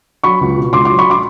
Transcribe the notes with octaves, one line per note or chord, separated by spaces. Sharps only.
F#3 B5 C#6
C#2
B2
C#2 C6 D6
F#3 C6 D6
B5 C#6
C6 D6